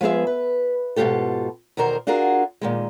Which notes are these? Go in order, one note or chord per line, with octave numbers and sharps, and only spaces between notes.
F3 G#3 B3 G#4 E5
B4
G#2 B2 C4 F4 G4 A4
E2 B2 D#3 A#4 C5
D4 F4 F#4 G#4 A#4
A#2 D#3 G#3